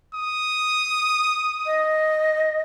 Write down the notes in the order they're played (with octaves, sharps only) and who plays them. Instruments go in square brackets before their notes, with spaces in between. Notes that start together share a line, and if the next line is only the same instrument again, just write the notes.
[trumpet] D#6
[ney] D#5